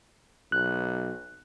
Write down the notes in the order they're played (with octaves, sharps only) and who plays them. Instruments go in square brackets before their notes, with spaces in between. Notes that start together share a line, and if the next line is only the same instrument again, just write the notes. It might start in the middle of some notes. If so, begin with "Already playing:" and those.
[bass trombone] B1 [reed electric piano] F#6